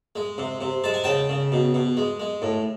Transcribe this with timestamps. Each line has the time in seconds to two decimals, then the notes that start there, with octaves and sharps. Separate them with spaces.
0.16 G#3
0.38 C3
0.61 C3
0.84 G#3 A5
0.94 G#5
1.04 C#3 G5 A5
1.29 C#3
1.52 B2
1.74 B2
1.97 G#3
2.20 G#3
2.42 A2